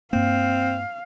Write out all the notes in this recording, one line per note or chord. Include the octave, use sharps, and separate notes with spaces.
G2 A#3 C4 F5